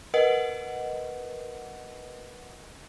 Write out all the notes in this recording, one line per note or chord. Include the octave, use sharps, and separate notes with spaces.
A#4 B4 D#5 F#5